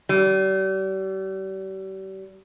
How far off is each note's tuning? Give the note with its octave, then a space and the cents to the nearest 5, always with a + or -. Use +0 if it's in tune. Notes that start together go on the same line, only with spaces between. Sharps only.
G3 -40